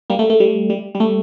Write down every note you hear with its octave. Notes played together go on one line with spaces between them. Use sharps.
G3 A#3
A3
A3
G3
G3
G3
A3